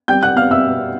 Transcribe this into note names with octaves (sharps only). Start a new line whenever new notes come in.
G3 G5 G6
F#5 F#6
B3 F5 F6
E5 E6
B2